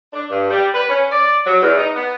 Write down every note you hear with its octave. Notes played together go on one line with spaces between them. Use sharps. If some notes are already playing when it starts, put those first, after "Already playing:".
D4
G2
G3
B4
C#4
D5
F#3
E2
D#4
B3